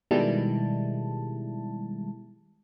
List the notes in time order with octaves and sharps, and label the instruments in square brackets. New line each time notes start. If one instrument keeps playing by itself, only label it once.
[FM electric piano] B2 D#3 G3 G#3 E4 A5